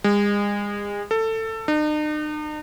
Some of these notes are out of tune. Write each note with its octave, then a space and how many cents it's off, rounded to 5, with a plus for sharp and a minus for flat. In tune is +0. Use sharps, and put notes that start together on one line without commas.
G#3 -35
A4 +20
D#4 -45